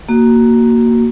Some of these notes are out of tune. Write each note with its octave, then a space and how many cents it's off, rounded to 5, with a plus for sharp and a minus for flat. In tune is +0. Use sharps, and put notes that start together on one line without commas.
A#3 +0 F#4 +10